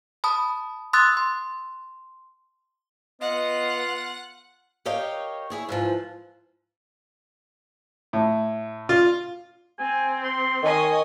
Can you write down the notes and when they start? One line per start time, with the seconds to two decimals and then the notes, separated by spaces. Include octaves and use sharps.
0.24 A5 B5 D#6
0.93 C6 D#6 E6 F#6 A6
1.17 C6
3.22 B3 F4 D#5 F#5
4.85 G4 A#4 C#5 D#5 F5 G5
5.50 E4 G#4 C#5
5.69 G#2 E3 F3
8.13 A2
8.89 F4
9.79 C4 G#5
10.24 C6
10.63 D#3 C#5 D#5 G#5